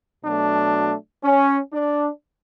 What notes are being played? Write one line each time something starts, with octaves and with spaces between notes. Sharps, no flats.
B2 F#3 A3 D4
C#4
D4